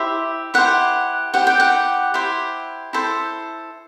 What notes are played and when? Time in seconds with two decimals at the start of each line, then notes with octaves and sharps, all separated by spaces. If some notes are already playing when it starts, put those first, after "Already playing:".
Already playing: E4 G4 C5 E5
0.54 E4 G4 C5 F#5
1.34 E4 G4 C5 F#5
1.47 G5
1.60 F#5
2.14 E4 G4 C5
2.93 E4 A4 C5